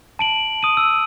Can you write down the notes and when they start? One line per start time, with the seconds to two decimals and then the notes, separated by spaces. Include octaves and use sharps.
0.19 A5 D7 F#7
0.63 D#6 D#7
0.77 E6